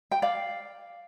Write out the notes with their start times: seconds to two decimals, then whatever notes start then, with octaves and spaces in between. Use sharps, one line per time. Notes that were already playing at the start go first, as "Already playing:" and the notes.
0.11 G5
0.22 D5 F5